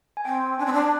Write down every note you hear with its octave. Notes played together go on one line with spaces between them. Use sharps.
G#5
C4 G5
D4 G#5
C4
D4